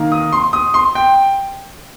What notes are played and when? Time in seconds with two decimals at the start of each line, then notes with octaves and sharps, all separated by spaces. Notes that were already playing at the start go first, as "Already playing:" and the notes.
Already playing: D#3 A#3 D#4
0.12 D#6
0.32 C6
0.53 D#6
0.74 C6
0.95 G5